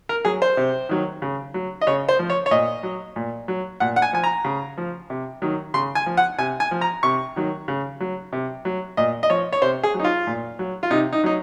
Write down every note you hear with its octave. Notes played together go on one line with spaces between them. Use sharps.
A#4
F#3 G#4
C5
C3
D#3 F#3
C#3
F#3
D#5
C#3 C#5
C5
F3
C#5
C#5
A#2 D#5
F#3
A#2
F#3
A#2 F#5
F#5
G#5
F3 G#5
A#5
C#3
F3
C3
D#3 F#3
C#3 C6
G#5
F3
F#5
C3 G#5
G#5
F3
A#5
C3 C#6
D#3 F#3
C#3
F#3
C3
F#3
A#2 D#5
D#5
F3 C#5
C#5
C3 C5
G#4
F#3
D#4
F4
A#2
F#3
F4
C3 D#4
D#4
F#3 D#4